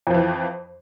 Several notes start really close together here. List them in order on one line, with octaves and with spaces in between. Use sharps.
F2 F3 E3